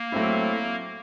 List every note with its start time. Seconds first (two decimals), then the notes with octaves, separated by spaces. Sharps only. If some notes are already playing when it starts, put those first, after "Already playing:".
Already playing: A#3
0.12 F#3 A3 C4 E4